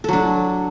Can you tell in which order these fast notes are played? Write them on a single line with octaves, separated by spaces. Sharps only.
A4 F#3 D4